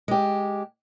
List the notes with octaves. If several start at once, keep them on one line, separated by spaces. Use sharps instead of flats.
G#3 G4